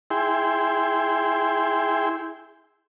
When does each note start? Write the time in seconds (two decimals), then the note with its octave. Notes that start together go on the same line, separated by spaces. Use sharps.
0.11 E4 G#4 G5 C6